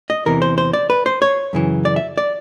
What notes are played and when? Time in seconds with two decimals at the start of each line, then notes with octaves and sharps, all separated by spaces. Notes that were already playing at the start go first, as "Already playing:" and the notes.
0.10 D#5
0.26 E2 C3 E3 A#4
0.42 C5
0.58 C5
0.73 D5
0.90 B4
1.06 C5
1.22 C#5
1.53 F#2 C#3 E3
1.85 D5
1.96 E5
2.18 D5